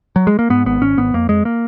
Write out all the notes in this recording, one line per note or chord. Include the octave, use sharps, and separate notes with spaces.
F#3
G#3
A#3
G#2 B3
G#1 B3
G#1 C#4
G#1 B3
F2 A#3
F2 G#3
A#3